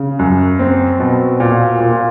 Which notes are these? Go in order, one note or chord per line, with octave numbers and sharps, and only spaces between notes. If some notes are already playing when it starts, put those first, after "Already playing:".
Already playing: C#3
F#2
C4
B2
A#2
A#2